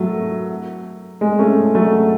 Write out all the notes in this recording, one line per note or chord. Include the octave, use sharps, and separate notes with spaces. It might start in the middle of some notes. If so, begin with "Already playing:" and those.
Already playing: F#3 A3
G#3
A3 C#4
F#3 A3